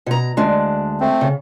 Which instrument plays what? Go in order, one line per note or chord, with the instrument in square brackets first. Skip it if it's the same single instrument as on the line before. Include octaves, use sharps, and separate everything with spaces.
[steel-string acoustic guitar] B2 A#5
D2 G#3 D4
[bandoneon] A3 C4
[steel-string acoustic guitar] C#3